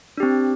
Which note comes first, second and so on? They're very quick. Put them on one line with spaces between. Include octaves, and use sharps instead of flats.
D4 G4 C4